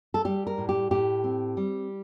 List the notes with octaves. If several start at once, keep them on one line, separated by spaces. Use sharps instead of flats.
A4
G3 G4
A#4
A2
G4
A2 G4
C4
G3